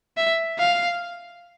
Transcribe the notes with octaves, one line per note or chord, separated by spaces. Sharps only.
E5
F5